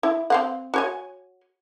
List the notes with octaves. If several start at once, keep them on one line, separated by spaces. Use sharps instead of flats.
E4
C4 F5 F#5
F#4 C#5 G#5